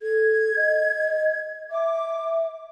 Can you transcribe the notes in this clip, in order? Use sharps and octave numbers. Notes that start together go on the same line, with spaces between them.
A4 G#6
D#5
E5 D6